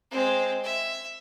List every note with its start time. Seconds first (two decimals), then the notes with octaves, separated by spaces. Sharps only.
0.11 G#3 C4
0.63 E5